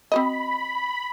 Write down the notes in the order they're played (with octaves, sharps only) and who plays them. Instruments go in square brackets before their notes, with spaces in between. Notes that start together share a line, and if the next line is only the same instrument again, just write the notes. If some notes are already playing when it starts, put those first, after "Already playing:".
[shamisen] C4 F#4 D#5 [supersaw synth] B5